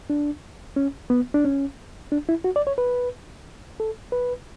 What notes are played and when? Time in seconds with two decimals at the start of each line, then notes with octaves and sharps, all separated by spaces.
0.10 D4
0.76 C#4
1.10 B3
1.34 D4
1.45 C#4
2.12 D4
2.29 E4
2.44 F#4
2.56 D5
2.67 C#5
2.78 B4
3.80 A4
4.12 B4